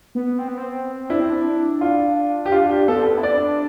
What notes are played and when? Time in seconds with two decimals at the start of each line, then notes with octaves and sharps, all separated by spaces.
0.15 B3
0.38 C4
0.48 B3
0.57 C4
1.10 D4 E4
1.20 C4
1.30 D4
1.81 F4
2.46 G4
2.52 D4 F4
2.70 G4
2.88 B3 A4
2.97 C4
3.06 B3
3.18 E4
3.23 D4 D5